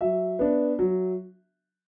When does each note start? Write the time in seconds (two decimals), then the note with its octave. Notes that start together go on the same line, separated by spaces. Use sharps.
0.01 F#3 E5
0.39 B3 D4
0.79 F#3